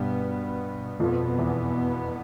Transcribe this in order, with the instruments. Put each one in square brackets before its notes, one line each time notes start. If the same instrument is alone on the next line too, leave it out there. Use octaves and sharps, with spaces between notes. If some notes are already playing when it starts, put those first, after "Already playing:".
Already playing: [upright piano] G2 G3 [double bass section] B2 B3
[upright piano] F2 F3 [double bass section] B2 B3
[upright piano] E2 E3